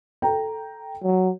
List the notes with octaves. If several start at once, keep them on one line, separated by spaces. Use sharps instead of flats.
A4 G5 A#5
F#3